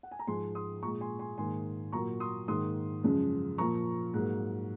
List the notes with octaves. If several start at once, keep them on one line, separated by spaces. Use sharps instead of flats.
F#5
G#5
A#5
G#2 F3 G#3 G#5 C6
C6 D#6
A#2 G#3 A#5 C#6
G#5 C6
G#5 C6
G#2 D#3 A#3 G#5 C6
A#2 F#3 A#3 A#5 C#6
C6 D#6
G#2 D#3 A#3 C6 D#6
F#2 C#3 F3 G#3
A#2 F3 A#3 A#5 C#6
G#2 F#3 A#3